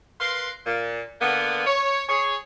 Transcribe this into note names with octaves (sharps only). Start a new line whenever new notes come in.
A#4 B4 F5 C6
A#2
D3 A#3 B3
C#5
G#4 C#5